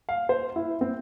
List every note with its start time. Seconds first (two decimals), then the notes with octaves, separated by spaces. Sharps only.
0.09 F5
0.29 C5
0.56 E4
0.81 C4